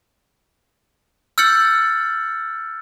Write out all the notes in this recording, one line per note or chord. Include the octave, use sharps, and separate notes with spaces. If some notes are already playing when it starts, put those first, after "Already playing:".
E6 F6 G6 A6 C#7 F#7